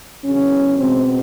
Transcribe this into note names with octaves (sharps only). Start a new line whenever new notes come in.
E2 C#3 F#3 C#4
B2 G#3 B3 C4